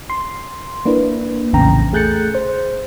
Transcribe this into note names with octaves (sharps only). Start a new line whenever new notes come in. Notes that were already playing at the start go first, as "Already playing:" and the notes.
C6
A#3 D4 E4 B4
A#1 E2 A2 C#3 G5 A#5
A3 G#4 F#6 G6 A6 C#7
C5